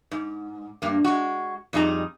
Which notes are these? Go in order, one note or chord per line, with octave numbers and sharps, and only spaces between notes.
G#2
G2 A#3
G#3 F#4
F2 G3 D#4 G#4 A#5